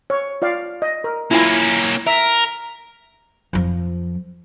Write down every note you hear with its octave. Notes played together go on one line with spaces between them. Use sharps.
C#5
F4 D5 F5
D#5
A#4
A#3 C#4 E4 F4 G#5
A#4 E5
F2 F3